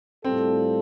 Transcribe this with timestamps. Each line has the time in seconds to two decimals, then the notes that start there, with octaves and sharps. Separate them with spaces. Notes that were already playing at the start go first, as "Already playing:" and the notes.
0.24 A2 G3 C4 F4 A4